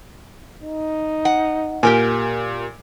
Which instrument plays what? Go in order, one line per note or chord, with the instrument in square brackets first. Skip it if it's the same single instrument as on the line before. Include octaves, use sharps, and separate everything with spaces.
[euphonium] D#4
[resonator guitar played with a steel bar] F#5
[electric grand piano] A#2 [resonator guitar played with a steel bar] G4 A#4 G#5